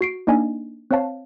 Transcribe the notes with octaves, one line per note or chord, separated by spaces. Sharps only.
F#4 C7 D7
A#3 D4 D#4 D5 D#5 G#5
C4 C5 C#5 F5 A5